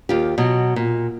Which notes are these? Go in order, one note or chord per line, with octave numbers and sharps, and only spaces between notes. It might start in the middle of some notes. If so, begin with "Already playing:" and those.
D#2 F4 G4
B2 F#3
A#2